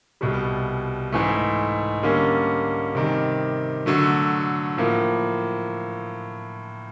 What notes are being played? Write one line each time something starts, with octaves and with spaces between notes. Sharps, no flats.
C2 B2 G3
G#2 E3 A3
D3 G3 A#3 C#4
C3 D#3 G3
D3 F#3 A3
A2 F3 A#3